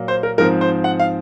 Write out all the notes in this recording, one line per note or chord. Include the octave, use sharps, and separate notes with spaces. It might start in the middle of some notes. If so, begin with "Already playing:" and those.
Already playing: A#2 F#3 A#3
C5
A#4
G#2 F3 C4 A#4
C5
F#5
F5